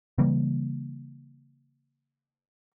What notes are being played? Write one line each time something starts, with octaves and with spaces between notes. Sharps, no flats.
C#3 E3 G3 A#3